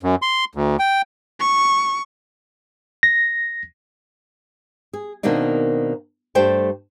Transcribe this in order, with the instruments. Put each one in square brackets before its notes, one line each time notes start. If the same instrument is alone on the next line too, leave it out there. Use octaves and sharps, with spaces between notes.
[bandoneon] F#2
C6
D2
G5
[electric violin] C#6
[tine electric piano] A#6
[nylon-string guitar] G#4
B2 D#3 A#3 C4 D4 D#4
G2 G3 A3 C5 G5 A5